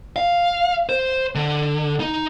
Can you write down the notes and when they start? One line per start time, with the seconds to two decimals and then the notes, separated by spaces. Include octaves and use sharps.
0.16 F5
0.89 C5
1.35 D3
2.00 D#4